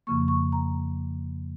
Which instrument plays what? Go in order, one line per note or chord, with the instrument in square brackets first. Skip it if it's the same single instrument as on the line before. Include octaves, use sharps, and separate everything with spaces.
[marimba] F2 C#3 F3 A#3 C#6
C#6
A#5